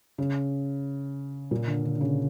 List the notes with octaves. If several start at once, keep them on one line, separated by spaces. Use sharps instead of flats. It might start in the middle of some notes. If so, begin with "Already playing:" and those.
C#3
A#2
D3
D3
D3
C#3